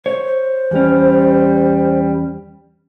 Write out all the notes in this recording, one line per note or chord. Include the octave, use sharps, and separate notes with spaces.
C5 C#5
E2 G3 C#4